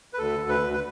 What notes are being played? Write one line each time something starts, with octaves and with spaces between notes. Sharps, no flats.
B4
D2 A4
D2
B4
D2
B4